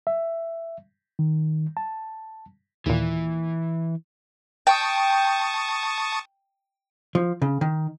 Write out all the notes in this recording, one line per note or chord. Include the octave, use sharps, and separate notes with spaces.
E5
D#3
A5
D#2 A#2 E3
G5 A5 C#6 D#6
F3
C#3
D#3